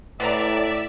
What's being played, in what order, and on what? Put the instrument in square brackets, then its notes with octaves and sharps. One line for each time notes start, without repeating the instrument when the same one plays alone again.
[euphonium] A2 [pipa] B3 C4 A#5 [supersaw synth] D5 [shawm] E5